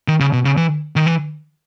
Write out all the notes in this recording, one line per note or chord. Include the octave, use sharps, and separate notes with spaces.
D#3
C#3
B2
C#3
E3
D#3
E3